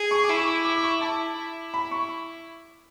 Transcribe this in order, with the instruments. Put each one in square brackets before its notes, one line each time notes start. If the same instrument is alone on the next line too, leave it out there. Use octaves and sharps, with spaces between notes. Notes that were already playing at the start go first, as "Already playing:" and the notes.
Already playing: [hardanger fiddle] G#4
[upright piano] C#6
D6
[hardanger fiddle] E4
[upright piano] C#6
D6
D6
C#6
[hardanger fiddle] E4 [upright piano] A5
[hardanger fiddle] E4
[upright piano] B5
C#6